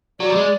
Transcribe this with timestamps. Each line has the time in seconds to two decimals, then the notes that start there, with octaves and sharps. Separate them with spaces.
0.20 F#3 D5
0.30 G3
0.36 G#3